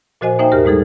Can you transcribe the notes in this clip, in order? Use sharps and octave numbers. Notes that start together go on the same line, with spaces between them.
A#2 F3 F#4 C5 D#5 G#5
A#3 D#4 C5 E5 G5
D#2 G#2 G4 A#4 F6
G3 G#3 D#4 G#4 A4